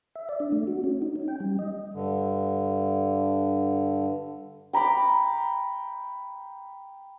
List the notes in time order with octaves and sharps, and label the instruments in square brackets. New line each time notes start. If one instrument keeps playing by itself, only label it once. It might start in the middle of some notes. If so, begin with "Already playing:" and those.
[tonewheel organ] E5
D5
D4
A3
F#4
C#4
D#4
C#4
G5
G3
D#5
[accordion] G2 D3
[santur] G5 A#5 B5 D6